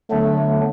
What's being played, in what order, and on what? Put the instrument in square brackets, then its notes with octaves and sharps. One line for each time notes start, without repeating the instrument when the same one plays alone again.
[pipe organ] D3 F#3 B3 D4 [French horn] A3